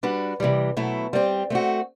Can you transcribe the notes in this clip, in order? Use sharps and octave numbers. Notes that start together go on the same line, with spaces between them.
G3 D4 F#4 B4
C3 E3 G3
B2 F#3 A3 E4
G3 C4 G4
A3 C4 F#4